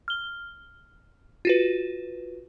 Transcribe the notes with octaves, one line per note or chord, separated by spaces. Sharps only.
F6 G7
F4 F#4 B4